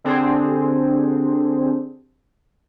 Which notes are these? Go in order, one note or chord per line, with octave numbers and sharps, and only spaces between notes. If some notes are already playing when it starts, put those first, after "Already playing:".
D3 C4 D4 G4 G#4 C5